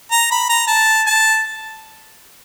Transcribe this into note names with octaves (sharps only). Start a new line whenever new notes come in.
A#5
B5
A#5
A5
A5